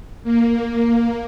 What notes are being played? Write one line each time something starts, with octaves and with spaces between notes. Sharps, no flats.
A#3